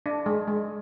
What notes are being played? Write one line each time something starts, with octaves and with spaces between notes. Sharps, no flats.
D4
G#3
G#3